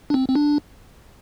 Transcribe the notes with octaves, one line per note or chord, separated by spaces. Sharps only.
D4
C4
C4
D4